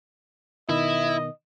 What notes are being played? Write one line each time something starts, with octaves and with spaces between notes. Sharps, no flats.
B2 D#3 E4 D#5